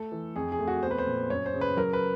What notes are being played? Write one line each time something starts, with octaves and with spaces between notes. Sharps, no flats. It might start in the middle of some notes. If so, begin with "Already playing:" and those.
Already playing: A3 A4
E3
F2 G#4
G#4
A3
F#4
B3 C5
B4
C5
A#2
F#2 C#5
C5
C#3
B4
F#3 A#4
B4